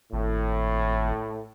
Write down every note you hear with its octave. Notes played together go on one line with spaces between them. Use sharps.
G#1 A2